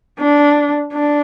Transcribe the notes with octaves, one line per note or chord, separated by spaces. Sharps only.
D4
D4